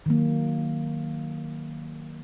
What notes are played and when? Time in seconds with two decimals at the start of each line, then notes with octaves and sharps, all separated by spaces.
0.06 D#3 F#3 A#3